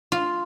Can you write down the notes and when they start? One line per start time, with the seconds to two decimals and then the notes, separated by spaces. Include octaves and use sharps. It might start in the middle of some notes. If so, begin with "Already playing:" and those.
0.12 F4